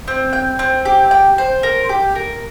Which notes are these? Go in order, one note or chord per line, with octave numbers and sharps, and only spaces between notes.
C4
G5
C4
G4
G5
C5
A#4
G4
A#4